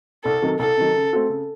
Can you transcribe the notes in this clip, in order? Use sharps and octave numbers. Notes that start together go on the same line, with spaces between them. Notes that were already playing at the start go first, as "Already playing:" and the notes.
C2 A4
C3 D#3 F#3
C2 A4
C3 D#3 F#3
C#3
A3 C4 F#4 A4
C#3